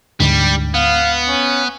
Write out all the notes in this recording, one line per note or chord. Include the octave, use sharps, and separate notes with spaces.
D2 G#2 D3 G3
B3 F5
C#4